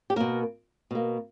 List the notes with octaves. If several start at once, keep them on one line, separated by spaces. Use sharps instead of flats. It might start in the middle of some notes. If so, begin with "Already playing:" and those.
G4
B2 A#3 A#4
B2 A#3